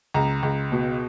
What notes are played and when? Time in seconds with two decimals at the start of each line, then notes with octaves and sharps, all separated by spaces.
0.14 C#2 A#5
0.43 C#2
0.72 B2